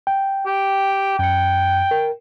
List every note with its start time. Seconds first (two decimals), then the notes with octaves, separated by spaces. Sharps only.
0.07 G5
0.46 G4
1.19 F#2 G5 C#7
1.91 A#4